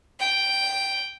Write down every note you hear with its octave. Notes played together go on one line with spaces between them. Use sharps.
G5